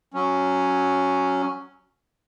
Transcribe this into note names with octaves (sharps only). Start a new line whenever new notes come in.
F#3 C#4